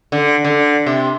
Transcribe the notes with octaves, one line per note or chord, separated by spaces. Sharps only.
D3
D3
C3